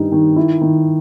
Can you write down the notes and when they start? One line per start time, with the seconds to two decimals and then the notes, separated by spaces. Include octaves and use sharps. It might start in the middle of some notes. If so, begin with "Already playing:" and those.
Already playing: G2 D#3 G3 D#4
0.12 D#3
0.36 E4
0.61 D#3